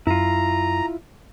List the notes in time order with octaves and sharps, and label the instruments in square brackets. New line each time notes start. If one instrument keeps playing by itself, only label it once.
[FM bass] F#2 [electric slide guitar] E4 F4 [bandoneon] A#5